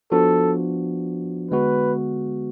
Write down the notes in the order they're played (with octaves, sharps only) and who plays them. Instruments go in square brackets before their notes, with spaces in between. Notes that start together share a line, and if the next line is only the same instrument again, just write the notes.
[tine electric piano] F3 B3 D4 F#4 [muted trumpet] A4
[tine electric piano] D3 G#3 B3 F#4 [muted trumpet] B4